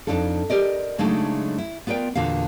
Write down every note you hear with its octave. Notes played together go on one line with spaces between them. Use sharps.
F2 D4 D#4 F4 A4
G4 A#4 D5 D#5
C#3 F#3 G#3 A3 D4 D#4
E4
B3 F4 A#4 D5 G5
E2 A#2 D3 F4 F#4 F5